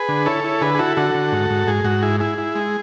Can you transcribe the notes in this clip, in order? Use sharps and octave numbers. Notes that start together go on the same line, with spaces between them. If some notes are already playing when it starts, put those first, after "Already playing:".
Already playing: G#4 B4
D3
E4 A4 C#5
E4
D3 G#4 B4
G#4
E4 F#4 A4
D3 F#4 A4
D3
G#2
G#2
G#2 G#4
G#2 F#4
E4 G#4
E4 G#4
E4
G#3